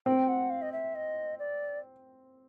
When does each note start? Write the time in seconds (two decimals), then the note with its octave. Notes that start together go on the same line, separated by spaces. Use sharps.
0.06 C4 G5
0.28 F#5
0.50 F5
0.62 D#5
0.72 E5
0.95 D#5
1.39 D5